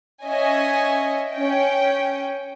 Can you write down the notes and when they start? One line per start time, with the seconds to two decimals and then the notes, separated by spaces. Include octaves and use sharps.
0.25 C#4 D#5 E5 G#5
1.32 C#4 G5